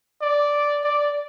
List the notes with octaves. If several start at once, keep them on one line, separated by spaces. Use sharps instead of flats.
D5
D5